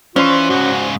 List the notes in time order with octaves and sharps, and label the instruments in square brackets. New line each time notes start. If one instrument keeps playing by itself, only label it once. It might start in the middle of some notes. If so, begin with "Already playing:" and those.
[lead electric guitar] E3 [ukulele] C#4 [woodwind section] F4 C#6 [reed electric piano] C5 D5 C6
[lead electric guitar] G#2 C#3 [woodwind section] F#4